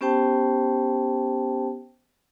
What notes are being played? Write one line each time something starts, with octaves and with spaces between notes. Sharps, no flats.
B3 C#4 G4 C5 G5 A5